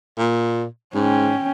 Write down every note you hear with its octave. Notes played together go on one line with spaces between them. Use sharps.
A#2
G#2 C#4 G5